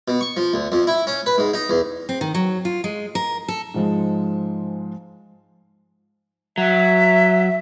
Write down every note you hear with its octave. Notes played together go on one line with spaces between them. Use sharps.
B2
C#6
F3
D2
F2
E4
C#4
B4
G#2
D#4
E2
C4
D#3
F#3
F4
G#3
A#4
A4
G#2 F3 G#3
F#3 E5